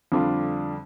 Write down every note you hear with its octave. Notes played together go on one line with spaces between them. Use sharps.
F2 D3 G3 D4 F4